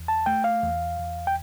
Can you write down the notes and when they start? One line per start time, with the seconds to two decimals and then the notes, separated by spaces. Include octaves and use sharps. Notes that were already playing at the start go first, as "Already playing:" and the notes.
Already playing: E2
0.08 A5
0.26 A3 G5
0.44 F5
0.63 E2
0.99 E2
1.27 G5